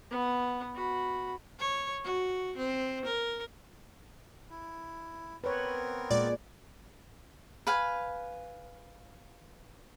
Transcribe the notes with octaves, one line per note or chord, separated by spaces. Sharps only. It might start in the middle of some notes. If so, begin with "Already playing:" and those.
B3 F#5
F#4 B5
C#5
F#4
C4
A#4
E4
B3 C4 A#4 B4 C#5
A#2 G#3 D5
B4 F5 G#5